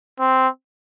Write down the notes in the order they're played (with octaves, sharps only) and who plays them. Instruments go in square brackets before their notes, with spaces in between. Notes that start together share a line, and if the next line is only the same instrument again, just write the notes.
[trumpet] C4